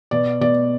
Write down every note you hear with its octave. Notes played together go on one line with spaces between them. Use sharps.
B2 D5
B2 D5